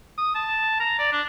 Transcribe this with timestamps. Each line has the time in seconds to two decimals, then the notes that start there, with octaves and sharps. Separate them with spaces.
0.18 D#6
0.35 A5
0.80 A#5
0.99 D5
1.12 D4